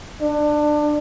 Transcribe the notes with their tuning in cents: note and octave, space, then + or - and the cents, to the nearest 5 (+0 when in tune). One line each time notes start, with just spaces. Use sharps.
D4 +20